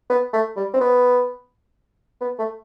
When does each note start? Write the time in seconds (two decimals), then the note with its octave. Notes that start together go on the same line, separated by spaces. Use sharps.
0.10 B3
0.33 A3
0.57 G3
0.74 C4
0.80 B3
2.21 B3
2.39 A3